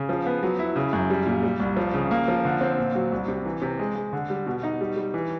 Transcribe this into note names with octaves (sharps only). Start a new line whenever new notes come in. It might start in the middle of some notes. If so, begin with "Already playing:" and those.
Already playing: C#3
F3
B3
F#3
E4
C#3
F#2
G3
A#2
G3
C2
F3
C#3
A#3
F3
D3
C4
A#2
F#3
C2
C3
E3
C3
G#3
G#3
D3
G3
B2
D#4
G3
G3
E3